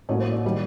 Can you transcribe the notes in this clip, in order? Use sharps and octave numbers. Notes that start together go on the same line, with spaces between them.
A1 A2 F#3 A#3 C#5
C5
D5
D#3 G3